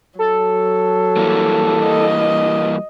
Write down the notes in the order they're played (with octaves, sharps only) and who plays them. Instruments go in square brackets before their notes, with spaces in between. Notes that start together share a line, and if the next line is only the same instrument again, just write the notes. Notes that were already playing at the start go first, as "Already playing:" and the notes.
[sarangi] F#3 [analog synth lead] A4
[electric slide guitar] E3 G3 A#3
[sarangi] D#5